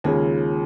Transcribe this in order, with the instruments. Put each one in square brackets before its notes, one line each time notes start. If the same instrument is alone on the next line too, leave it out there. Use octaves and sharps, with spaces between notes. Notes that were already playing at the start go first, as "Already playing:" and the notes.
[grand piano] D#2 C#3 G#3 [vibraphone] F4 G#4